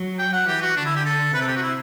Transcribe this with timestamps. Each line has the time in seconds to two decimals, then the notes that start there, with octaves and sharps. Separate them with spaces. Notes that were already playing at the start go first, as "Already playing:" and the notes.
Already playing: F#3
0.19 G5
0.33 F#5
0.47 E3 G4
0.62 F#4
0.76 D3 D4
0.85 E4
0.96 G4
1.06 A4
1.34 C3 B4
1.41 A4
1.48 G4
1.56 F#4
1.63 E4